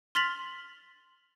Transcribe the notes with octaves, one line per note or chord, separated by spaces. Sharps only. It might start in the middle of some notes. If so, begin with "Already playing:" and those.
C6 F6 A6 B6 F7 F#7